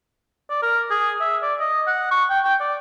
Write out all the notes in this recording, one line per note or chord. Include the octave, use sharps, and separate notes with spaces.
D5
A#4
G#4
E5
D5
D#5
F#5
C#6
G5
G5
D5